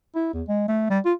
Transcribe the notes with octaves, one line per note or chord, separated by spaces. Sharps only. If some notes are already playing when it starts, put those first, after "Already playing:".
E4
E2
G#3
A3
G3
F4